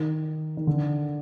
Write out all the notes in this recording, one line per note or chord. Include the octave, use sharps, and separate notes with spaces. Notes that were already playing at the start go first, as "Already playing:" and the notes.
Already playing: D#3
D#3
D3